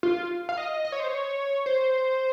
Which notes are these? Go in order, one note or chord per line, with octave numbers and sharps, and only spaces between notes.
F4
F5
D#5
D#5
C#5
C5
C#5
C5